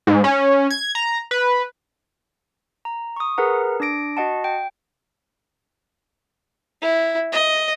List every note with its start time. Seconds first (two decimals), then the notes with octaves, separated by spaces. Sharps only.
0.07 G#2
0.24 C#4
0.71 G#6
0.95 A#5
1.31 B4
2.85 A#5
3.16 C#6 D#6
3.38 G#4 A#4 B4 F#5 A#5
3.80 D4 D6 A#6 D7
4.17 F#4 D#5 F#5 A5
4.44 G5
6.82 E4
7.32 D#5